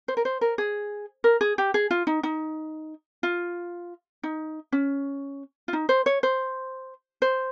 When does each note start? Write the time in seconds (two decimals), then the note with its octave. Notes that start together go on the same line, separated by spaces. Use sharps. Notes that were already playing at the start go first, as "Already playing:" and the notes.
0.08 C5
0.17 A#4
0.25 C5
0.41 A#4
0.58 G#4
1.24 A#4
1.41 G#4
1.58 G4
1.74 G#4
1.91 F4
2.07 D#4
2.23 D#4
3.23 F4
4.23 D#4
4.72 C#4
5.68 F4
5.73 D#4
5.89 C5
6.06 C#5
6.23 C5
7.22 C5